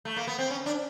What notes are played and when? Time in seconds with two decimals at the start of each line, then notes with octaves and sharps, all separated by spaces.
0.05 A3
0.16 A#3
0.27 B3
0.39 C4
0.50 C#4
0.66 D4